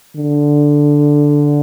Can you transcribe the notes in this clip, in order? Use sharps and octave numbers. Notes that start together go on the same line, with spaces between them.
D3